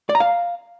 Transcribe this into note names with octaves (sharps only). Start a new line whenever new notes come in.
D5
A#5
F5